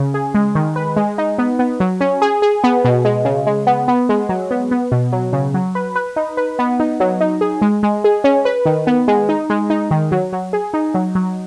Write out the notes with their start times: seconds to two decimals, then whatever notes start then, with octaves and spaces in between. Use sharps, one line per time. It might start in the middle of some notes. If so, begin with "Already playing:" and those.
Already playing: C#3
0.14 G#4
0.34 G#3
0.55 D#3
0.76 B4
0.96 G#3
1.18 D#4
1.38 B3
1.59 B3
1.80 F#3
2.01 C#4
2.22 G#4
2.42 G#4
2.64 B3
2.84 B2
3.05 G#3
3.25 C#3
3.47 G#3
3.67 B3
3.88 B3
4.09 G#3
4.29 F#3
4.51 B3
4.71 B3
4.92 B2
5.12 F#3
5.33 C#3
5.54 F#3
5.75 B4
5.96 B4
6.16 D#4
6.37 B4
6.59 B3
6.80 D#4
7.00 F#3
7.21 D#4
7.41 G#4
7.62 G#3
7.83 G#3
8.04 G#4
8.24 C#4
8.45 B4
8.66 D#3
8.87 B3
9.08 G#3
9.29 D#4
9.50 G#3
9.70 D#4
9.91 D#3
10.12 F#3
10.33 F#3
10.53 G#4
10.74 D#4
10.94 F#3
11.15 F#3